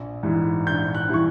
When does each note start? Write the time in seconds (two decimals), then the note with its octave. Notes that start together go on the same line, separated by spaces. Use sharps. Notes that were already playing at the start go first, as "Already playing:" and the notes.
Already playing: A#1
0.23 G#2 E3 G3
0.66 A#1 G6
0.95 F#6
1.09 E3 G3 C#6